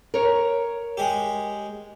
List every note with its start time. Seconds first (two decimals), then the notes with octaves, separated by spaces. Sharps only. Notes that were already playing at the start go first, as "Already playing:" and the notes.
0.14 A#4 C#5
0.97 G#3 G4